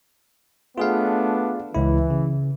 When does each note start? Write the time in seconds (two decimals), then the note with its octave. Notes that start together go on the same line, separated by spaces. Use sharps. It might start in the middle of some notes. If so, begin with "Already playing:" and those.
0.78 A3 B3 D4 F4 G#4 F5
1.75 C#2 E3 E4
2.10 C#3